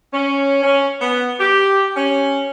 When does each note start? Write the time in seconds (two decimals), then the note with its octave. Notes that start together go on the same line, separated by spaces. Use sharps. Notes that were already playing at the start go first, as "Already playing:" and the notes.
0.13 C#4
0.63 C#4
1.01 B3
1.39 G4
1.96 C#4